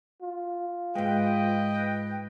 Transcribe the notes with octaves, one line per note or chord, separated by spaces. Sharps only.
F4
G#2 G#3 B4 D#5 G5